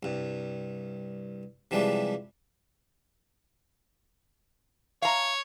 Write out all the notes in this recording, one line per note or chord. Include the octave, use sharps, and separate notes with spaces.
C2 G2
C3 E3 F3 G3 G#3 D4
C#5 F5 A#5